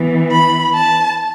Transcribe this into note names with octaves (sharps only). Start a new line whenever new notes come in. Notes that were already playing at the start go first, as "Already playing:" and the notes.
Already playing: E3 B3
B5
A5